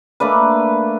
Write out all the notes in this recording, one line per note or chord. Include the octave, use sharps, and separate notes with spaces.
A3 A#3 D4 B4